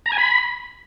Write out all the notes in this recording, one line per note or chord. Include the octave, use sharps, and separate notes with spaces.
A#5
G#5
B5